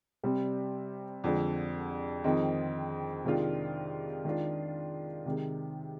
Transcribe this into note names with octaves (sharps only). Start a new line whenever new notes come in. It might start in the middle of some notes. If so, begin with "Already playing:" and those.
C3 G3 C4
F2 D3 G#3
F2 D#3 G#3 C4 D#4
C3 D#3 G#3 D4 F4
D#3 G#3 D4 F4
C3 D#3 G#3